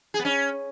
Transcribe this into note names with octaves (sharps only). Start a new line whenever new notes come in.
G#4
B3
C#4